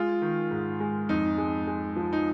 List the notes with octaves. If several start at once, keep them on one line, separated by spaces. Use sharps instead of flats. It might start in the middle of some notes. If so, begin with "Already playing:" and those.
Already playing: G#3 F4
D#3
G#2
G#3
F2 D#4
G#3
G#3
F3
D#4